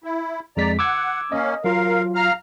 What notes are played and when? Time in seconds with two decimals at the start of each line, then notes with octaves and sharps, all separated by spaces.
0.04 E4
0.57 F2 G#3 D5 A#5 B6
0.79 F#5 D6 E6 G#6
1.32 A#3 C#4 D#5
1.64 F#3 F4 A#4 F5
2.15 F5 A#5 F6